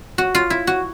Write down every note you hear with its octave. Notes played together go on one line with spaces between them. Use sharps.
F#4
F4
E4
F#4